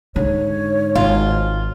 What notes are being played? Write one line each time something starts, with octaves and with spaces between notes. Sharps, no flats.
G#2 D3 C#5
G#1 F4